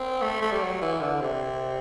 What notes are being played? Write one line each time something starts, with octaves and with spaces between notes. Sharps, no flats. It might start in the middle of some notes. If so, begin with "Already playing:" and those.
Already playing: C4
A3
A3
G3
F#3
E3
D3
C3